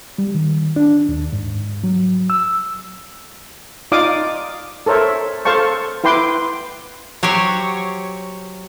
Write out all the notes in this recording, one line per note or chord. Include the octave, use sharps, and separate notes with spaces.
G3
D#3
D4
D#2
G#2
F#3
E6
D#4 F4 D5 F5 D6 D#6
A4 A#4 C5 C#5 E5
A4 C5 F5 A5 C#6
E4 B4 G5 C6 D6
F#3 G4 C5 C#5